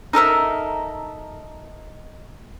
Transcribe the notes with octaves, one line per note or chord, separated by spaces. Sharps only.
D#4 A4 A#4 E5